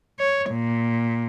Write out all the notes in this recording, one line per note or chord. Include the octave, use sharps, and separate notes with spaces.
C#5
A#2